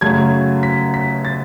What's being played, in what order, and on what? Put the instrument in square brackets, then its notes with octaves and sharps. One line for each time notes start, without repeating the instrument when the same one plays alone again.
[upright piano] F#2 C#3 F#3 A3 G#6
B6
B6
A6